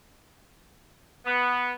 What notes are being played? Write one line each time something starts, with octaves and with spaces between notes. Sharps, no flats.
B3